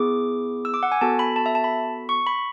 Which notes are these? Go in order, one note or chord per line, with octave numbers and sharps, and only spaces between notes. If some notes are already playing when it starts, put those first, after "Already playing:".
Already playing: B3 E4 G#4 D6
E6
D6
F#5
G#5
B3 F#4 A4 A5
B5
A5
E5
A5
B5
C#6
B5